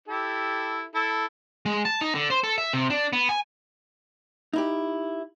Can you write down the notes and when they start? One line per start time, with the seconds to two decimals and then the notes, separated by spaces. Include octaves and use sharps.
0.08 E4 G4 A4
0.95 E4 A4
1.66 G#3
1.85 A5
2.01 D#4
2.15 D3
2.30 C5
2.43 A4
2.58 E5
2.73 C3
2.90 D4
3.13 B3
3.29 G#5
4.53 D#4 E4 G4